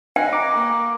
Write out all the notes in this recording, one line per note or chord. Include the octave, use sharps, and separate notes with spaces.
G4 B4 D#5 G5 G#5
A#5 D6
A#3